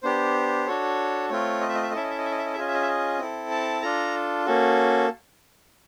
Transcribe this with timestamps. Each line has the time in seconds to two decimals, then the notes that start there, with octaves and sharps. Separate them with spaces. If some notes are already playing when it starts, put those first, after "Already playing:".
0.03 B3 D4 G4 C5
0.67 D4 F#4 A4 C#5
1.29 A3 C4 F4 C#5
1.61 D#5
1.69 E5
1.75 D#5
1.83 E5
1.90 D#5
1.93 C#4 E4 A4 E5
2.03 D#5
2.10 E5
2.18 D#5
2.25 E5
2.32 D#5
2.38 E5
2.45 D#5
2.53 E5
2.56 C#4 F4 G#4 D#5
2.67 E5
2.74 D#5
2.82 E5
2.88 D#5
3.19 C4 E4 A4
3.50 A5
3.82 D4 F4 A4 A#5
4.46 A#3 C#4 F#4 A4